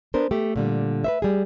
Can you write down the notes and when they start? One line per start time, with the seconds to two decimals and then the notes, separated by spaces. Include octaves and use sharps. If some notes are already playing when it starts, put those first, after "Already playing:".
0.14 B3 D4 A#4 C5
0.31 A3 G4
0.56 A#2 D3 G3
1.04 B4 C5 E5
1.22 G3 G#4